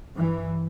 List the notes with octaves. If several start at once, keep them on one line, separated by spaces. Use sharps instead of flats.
G2 E3